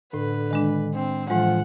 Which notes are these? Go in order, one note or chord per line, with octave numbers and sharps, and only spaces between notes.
A2 D3 B4
D#3 G#3 D4
C4
A2 E3 F3 G#3 F#5